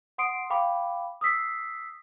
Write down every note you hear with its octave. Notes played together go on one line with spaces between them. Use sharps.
F#5 C6 D#6 C7 D7
F5 G5 B5 D6
D#6 E6 B6 C7